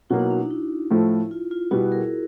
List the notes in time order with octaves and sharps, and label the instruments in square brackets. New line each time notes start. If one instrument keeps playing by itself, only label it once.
[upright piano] B2 F#3 A#3 [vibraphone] E4 F#4
[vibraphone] D#4
D4
D#4
E4
[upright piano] A2 F3 A3
[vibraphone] F4
F4
[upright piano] B2 G3 B3 [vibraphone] E4 F#4
[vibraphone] G#4 A#4